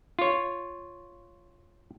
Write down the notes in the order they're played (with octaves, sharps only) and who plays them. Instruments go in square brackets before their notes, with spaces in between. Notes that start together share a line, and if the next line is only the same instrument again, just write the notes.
[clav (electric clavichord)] F4 C#5